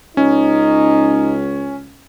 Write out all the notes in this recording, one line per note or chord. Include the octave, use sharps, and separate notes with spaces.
C#2 C#4 D#4